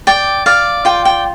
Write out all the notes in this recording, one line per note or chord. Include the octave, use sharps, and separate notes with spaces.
D5 G5
D5 F5
F4 G5
G5